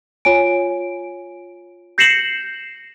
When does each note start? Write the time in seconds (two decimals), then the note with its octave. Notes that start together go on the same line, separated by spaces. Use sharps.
0.25 F4 C#5 G#5 D7
1.98 G6 A#6 C7 C#7 E7 F#7